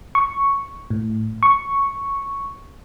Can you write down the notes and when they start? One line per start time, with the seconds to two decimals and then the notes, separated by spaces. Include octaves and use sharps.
0.15 C#6
0.90 A2
1.43 C#6